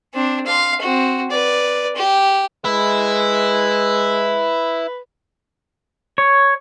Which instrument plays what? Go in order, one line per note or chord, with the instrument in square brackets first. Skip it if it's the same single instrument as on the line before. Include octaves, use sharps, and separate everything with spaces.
[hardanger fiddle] C4 D4
F5 C6
C4 F#4
B4 D5
G4
[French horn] G#3 [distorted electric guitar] E4 [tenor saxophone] B4
[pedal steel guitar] C#5